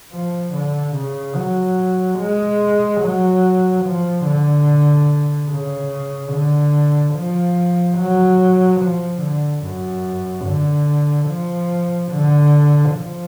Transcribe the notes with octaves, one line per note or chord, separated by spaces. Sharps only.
F3
D3
C#3
F#3
G#3
F#3
F3
D3
C#3
D3
F3
F#3
F3
D3
F#2
D3
F3
D3
F3